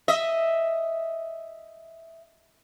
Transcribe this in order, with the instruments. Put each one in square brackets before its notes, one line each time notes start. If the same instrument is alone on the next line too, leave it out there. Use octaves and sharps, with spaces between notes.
[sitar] D#5 E5